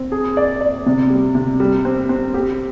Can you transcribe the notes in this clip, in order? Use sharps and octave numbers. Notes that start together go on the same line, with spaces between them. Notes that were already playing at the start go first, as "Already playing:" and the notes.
Already playing: C4
G#4
D5
D5
C3
G3
C3
G3
C4
C4
G4